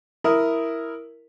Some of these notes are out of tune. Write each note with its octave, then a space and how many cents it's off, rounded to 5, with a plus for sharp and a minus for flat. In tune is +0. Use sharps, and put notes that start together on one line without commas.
E4 +0 A#4 +0 D#6 +0